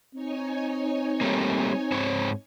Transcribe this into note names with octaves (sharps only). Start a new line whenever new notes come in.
C4 D#4 C#5 G#5
G3 A3 A#3
G#2 C5 C#5